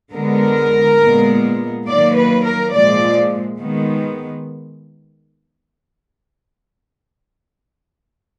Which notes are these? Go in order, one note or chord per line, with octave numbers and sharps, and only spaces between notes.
D3 G#3 B3 A#4
A#2 G#3 B3
D#3 F#3 A#3 D5
B4
A#4
A#2 F3 G#3 D5
D#3 G#3 B3